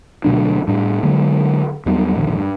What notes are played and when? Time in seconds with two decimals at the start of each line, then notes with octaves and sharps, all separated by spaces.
0.24 D2 B2 F#3 D4
0.68 A2 G3 D4
1.03 D3 F#3 G#3 A#3
1.86 D#2 F#3 G3 B3
2.15 D1 A#1 D#2 D3
2.35 G2